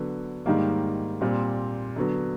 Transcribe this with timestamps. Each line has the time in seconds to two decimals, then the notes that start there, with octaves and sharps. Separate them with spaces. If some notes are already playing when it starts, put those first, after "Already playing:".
Already playing: D3 F#3 B3
0.46 G#2 D#3 G3 A#3
1.21 A#2 G3 C4
1.96 D3 F#3 B3